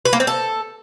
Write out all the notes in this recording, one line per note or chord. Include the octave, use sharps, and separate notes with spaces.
B4
A#3
C4
A4